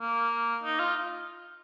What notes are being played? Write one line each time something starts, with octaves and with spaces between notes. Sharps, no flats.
A#3
D#4
F4